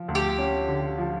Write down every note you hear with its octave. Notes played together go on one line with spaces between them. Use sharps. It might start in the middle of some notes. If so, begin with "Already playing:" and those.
Already playing: F3
D2
G4
C#4
D3
F3